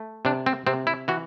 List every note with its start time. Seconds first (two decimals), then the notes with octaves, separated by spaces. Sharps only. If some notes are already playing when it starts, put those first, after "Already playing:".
Already playing: A3
0.25 C3 D4
0.46 C4
0.67 C3 C4
0.87 E4
1.08 E3 F#4